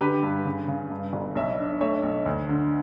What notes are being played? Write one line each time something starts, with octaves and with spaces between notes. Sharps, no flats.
D3 G4 B4
G2
C#3
C#3
G2
G1
B1 C#5 E5
D4
A3 C#5 E5
B1
D2
D3